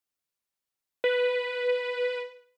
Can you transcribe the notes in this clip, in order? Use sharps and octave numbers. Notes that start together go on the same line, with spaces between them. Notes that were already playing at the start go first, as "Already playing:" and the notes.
B4